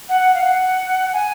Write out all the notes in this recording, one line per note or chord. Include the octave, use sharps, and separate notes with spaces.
F#5
F5
F#5
G#5